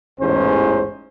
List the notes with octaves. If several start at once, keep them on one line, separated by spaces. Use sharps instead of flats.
A1 E2 G#2 C#4 C5